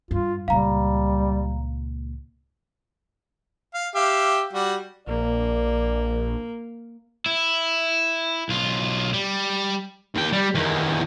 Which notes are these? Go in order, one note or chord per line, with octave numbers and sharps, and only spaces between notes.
G2 F4
C#2 A#2 G3 F5 A#5
F5
G4 E5 F5
G3 F#4
A#1 A#3 D5
E4
B1 F4
G3
D#2 G5
G3
E2 D#3